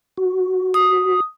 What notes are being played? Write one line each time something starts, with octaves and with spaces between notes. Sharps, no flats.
F#4
D#6